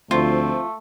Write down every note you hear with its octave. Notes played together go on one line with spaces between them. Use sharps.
D2 F3 A3 C4 F4